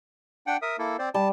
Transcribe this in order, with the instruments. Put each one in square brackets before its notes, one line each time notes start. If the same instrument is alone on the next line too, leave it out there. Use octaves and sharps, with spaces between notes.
[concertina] D4 F#5 G5
A#4 E5 D#6
A#3 E4 A4
C4 C5 D5
[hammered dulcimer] G3 [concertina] A5